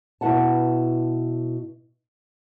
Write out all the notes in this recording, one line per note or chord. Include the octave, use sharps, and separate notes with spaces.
B2 E4 B4 F#5 A5